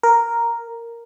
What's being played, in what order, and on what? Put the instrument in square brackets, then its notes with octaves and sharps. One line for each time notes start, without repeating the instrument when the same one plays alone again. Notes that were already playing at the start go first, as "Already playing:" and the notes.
[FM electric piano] A#4